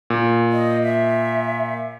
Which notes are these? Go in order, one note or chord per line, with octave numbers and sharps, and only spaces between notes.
A#2
D#5
E5